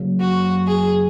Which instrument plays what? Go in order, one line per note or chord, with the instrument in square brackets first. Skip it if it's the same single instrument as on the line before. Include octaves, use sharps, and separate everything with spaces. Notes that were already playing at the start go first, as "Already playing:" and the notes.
Already playing: [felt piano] F#1 F#2 C#3
[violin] F#4
G#4